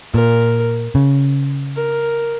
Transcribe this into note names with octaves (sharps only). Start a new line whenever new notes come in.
A#2 A#4
C#3
A#4